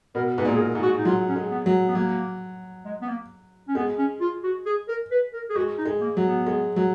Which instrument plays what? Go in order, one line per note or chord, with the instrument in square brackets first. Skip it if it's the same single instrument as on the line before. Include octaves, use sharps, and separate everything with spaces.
[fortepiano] B2 [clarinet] A#4
[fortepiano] G#2 [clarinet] B4
[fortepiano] A#2
[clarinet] G#4
A#4
[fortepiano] G#2
[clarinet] F#4
D#4
[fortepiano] F#3 [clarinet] F4
[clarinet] C#4
[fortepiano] G#3
[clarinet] B3
[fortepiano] F#3
[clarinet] B3
[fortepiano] F#3 [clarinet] A#3
[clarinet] G#3
B3
A#3
C#4
[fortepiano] G#3 [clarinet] B3
[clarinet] C#4
F4
F#4
G#4
A#4
B4
A#4
G#4
[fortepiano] G#3 [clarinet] F#4
[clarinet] D#4
[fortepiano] G#3
[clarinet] A#3
[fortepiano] F#3
[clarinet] B3
[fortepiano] G#3
F#3